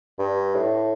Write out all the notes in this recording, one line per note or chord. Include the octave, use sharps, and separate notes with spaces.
G2
A2